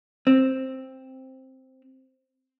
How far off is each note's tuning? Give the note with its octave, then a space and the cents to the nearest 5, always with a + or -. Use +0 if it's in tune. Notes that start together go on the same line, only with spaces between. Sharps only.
C4 +5